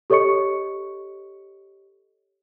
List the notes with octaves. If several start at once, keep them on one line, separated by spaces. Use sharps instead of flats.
G4 A4 C#5 D#5 C#6 C#7